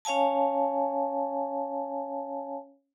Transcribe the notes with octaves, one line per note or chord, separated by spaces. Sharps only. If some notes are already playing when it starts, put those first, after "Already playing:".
C#4 C#5 F5 G#5 A5